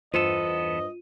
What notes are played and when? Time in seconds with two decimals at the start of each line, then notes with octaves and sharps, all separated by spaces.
0.14 E2 G2 B3 F4 A4 C5 D#5 D#7